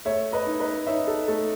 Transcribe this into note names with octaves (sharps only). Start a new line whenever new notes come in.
A3 C#5 E5
B4 D#5
D#4
B4 D#5
D#4 C#5 E5
A4
A3 A4